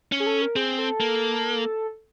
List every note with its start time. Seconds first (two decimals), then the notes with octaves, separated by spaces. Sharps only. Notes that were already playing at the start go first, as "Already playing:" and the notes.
0.12 C#4
0.20 G#4
0.26 A4
0.42 A#4
0.56 C4 G#4
0.78 A4
1.00 A#3